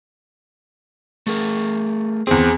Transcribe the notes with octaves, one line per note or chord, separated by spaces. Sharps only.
A3 G#4 A#4
E2 C4 G#4